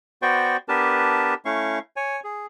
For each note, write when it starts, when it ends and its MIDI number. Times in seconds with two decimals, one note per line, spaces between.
0.22 0.57 59
0.22 0.57 66
0.22 0.57 72
0.22 0.57 74
0.22 0.57 79
0.22 0.57 85
0.69 1.34 59
0.69 1.34 62
0.69 1.34 67
0.69 1.34 70
0.69 1.34 71
0.69 1.34 81
1.45 1.79 57
1.45 1.79 61
1.45 1.79 64
1.45 1.79 77
1.45 1.79 85
1.96 2.20 73
1.96 2.20 80
2.24 2.46 68